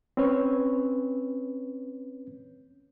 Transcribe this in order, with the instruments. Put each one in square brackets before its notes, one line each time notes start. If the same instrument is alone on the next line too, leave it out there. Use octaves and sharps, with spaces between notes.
[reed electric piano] C4 C#4 B4 C#5